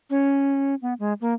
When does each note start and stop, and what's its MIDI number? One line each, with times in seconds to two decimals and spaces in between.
0.10 0.75 61
0.82 0.94 59
0.99 1.13 56
1.21 1.34 58